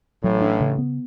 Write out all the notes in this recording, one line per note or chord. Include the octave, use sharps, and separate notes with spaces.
A1 A2 F#3
D4
C#3
B3